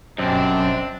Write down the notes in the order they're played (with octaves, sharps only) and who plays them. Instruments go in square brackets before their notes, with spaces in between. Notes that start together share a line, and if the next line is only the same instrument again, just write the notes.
[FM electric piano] G1 B2 D#5 [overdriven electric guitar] F#2 [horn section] G3 C4 D4